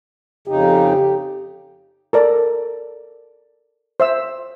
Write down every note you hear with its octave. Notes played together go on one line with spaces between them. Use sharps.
F2 C#3 D#4 G4
A4 A#4 D5
C5 E5 E6